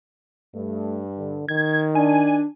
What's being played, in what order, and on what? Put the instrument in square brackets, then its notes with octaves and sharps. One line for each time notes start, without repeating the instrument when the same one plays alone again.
[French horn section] G2 [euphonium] A3
[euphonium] D3
[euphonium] D#3 [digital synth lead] G#6
[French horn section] D4 [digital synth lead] G#5